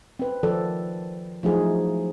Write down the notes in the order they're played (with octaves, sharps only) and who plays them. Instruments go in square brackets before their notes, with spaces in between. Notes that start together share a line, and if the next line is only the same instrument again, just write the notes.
[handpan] C4 B4
D#3 F3 A4 D5
F3 F#3 A3 D#4 E4 G#4